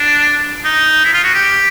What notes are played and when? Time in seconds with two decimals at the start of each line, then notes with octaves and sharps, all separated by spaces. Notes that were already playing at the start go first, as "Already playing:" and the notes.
Already playing: D4
0.65 D#4
1.04 E4
1.13 F4
1.23 F#4
1.34 G4